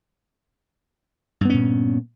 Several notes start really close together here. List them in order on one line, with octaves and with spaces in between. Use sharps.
G2 B3 C#4 A#2